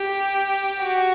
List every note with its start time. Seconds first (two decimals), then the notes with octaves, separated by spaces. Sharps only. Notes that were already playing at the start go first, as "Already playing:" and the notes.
Already playing: G4
0.80 F#4